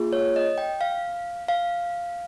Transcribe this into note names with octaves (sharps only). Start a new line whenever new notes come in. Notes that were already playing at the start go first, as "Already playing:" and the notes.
Already playing: A#3 F4 G#4
C#5
D#5
G5
F5
F5